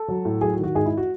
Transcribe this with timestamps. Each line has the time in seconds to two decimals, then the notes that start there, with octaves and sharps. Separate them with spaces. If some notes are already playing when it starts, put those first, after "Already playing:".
Already playing: A4
0.09 F#3
0.25 A2
0.41 F#3 G#4
0.53 F#4
0.58 D#3
0.64 F#4
0.75 G#2 G#4
0.86 E4
0.97 F#4